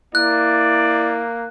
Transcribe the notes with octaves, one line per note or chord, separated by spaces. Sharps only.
A#3 E4 D5 F#6